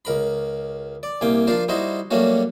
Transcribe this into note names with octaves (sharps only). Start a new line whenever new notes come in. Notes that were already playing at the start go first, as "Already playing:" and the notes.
C#2 A#4 B5
D5
C2 C3 A#3 G5 G#5
F3 D4 F4 A#4 C5
G3 D#4 E4 F#4 C5 D#5
F#3 G3 A3 A#3 C#4 F#4